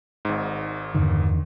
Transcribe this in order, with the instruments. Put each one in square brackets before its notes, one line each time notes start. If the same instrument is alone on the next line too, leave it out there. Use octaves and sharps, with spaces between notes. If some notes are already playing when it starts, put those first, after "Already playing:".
[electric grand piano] G#1 G#2
[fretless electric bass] E2 D3 D#3 [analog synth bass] G2